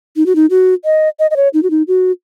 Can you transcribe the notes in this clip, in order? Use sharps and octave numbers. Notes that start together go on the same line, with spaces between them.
D#4
F#4
D#4
F#4
D#5
D#5
D#5
C#5
D#4
F#4
D#4
F#4